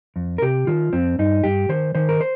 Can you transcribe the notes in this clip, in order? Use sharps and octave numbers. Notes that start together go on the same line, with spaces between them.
F2
A#4
C3 G4
D#3 F4
F2 C4
G2 D#4
G2 G4
D#3 C5
D#3 C5
A#4
C5